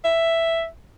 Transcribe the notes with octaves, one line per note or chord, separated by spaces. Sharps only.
E5